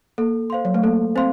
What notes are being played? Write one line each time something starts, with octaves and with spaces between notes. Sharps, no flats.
A#3 A4
C5 F5 C6
F#3
A3
A#3 A4
C4 C5 F5 C6